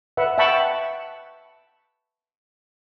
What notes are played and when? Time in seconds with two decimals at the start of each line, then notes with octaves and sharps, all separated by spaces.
0.17 B4 E5 F#5
0.38 E5 F#5 G5 A5 B5 C#6